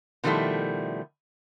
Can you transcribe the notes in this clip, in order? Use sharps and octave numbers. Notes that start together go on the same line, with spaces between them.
B2 D#3 F3 G3 A3 E4